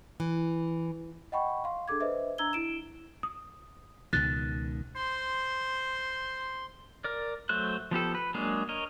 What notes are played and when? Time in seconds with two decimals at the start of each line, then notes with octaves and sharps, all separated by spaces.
0.20 E3
1.32 D#5 F#5 G5 B5 C#6
1.64 F5 C6
1.88 D4 G#4 A4 D6 G#6
2.00 B4 C5 D#5 E5
2.38 D4 A#5 E6 G#6 G7
2.53 E4 D7 E7
3.23 D#6
4.13 C#2 B2 D#3 F#6 A6
4.95 C5 C6
7.04 A#4 D5
7.49 F#3 A3 C5 F#6
7.91 F3 B3 G4 A4
8.15 B4
8.34 F#3 G#3 A#3 D4 G#4
8.69 A#4 C#5 D#5